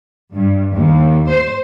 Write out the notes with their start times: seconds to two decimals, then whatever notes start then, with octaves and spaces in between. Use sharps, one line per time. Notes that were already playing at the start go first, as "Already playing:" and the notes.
0.33 G2
0.72 D#2
1.28 C5